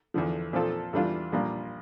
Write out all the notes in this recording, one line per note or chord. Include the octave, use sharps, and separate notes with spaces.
E2 D3 F3
A#2 F3 C4 F4 A4
E2 E3 G3 D4 F4
A#1 A#2 G3 A#3 F4